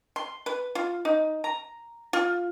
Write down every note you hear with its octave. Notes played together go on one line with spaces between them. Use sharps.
C6
B4
F4
D#4
A#5
F4